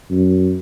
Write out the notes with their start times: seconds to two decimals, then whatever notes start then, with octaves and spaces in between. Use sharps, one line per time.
0.10 F#2